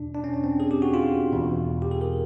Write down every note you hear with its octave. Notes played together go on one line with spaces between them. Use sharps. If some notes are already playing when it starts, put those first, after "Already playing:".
Already playing: E2 B2 D4
D4
C#4
C#4
C4
G#4
G4
F#4
F4
E2 B2
G4
G#4
A#4